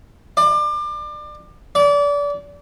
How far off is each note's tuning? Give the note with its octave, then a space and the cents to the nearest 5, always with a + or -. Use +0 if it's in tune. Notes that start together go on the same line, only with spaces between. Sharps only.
D5 +30
D5 -30